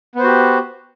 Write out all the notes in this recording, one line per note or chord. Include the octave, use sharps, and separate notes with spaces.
B3 F#4 G4 C5